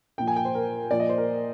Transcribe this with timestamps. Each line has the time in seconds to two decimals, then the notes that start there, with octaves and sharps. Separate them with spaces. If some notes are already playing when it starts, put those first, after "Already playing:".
0.18 A#2 F3 G5
0.27 G#5
0.36 G5
0.45 C5
0.55 A#4
0.91 A#2 F3 D5
1.00 D#5
1.09 C5
1.18 A#4